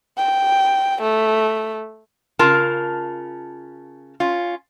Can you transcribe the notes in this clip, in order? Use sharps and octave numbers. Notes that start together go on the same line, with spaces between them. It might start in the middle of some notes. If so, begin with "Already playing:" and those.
G5
A3
C#3 F4 A#4 A5
C#4 F4